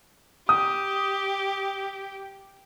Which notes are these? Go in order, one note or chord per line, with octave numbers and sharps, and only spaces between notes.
G4 D#6